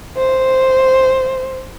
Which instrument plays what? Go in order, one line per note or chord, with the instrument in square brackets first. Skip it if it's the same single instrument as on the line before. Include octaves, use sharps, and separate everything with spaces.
[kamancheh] C5